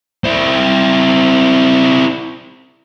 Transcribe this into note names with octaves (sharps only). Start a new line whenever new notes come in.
C4 E4